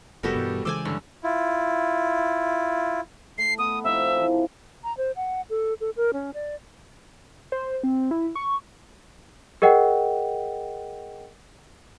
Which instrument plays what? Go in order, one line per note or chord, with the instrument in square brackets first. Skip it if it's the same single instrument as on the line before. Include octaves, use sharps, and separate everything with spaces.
[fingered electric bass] F1 [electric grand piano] G3 B3 F#4 [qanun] G4 A4 A#4
[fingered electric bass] G2 B2 E3
[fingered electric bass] C#3 E3 G#3 [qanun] C5 D5 G#5 [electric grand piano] D6 E6
[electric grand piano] G2 D3 [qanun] C#4
[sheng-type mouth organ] E4 F4
[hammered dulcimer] A3 [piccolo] C7
[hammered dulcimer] B3 [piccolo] D#6
[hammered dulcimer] C3 F3 D#4 [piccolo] E5
[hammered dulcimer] E3 F4
[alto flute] A#5
C5
F#5
A4
A4
A#4
C#4
D5
[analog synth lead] C5
C4
E4
C#6
[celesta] G#4 A#4 D#5 F#5 G5